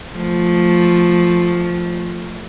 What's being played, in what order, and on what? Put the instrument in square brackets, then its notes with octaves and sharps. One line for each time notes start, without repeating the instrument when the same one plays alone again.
[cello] F3 A3